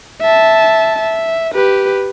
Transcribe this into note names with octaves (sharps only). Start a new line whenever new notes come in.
E5 A5
E5
G4 B4